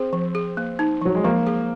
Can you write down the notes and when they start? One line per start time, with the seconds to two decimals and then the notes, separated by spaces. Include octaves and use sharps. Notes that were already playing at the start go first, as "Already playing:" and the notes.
Already playing: C4 G#4
0.13 F3
0.35 G#4
0.57 A#3
0.79 D#4
1.02 F3 F#3
1.15 G#3
1.24 F3 A#3
1.47 G#4